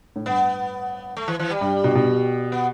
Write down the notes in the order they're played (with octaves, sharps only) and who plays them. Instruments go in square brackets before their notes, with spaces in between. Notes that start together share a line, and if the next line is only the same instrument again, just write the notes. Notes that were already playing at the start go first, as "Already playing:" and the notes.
[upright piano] A2
[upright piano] G2 [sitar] B3
[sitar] A3
E3
E3
G3
[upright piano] G2
B2
B2
[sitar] B3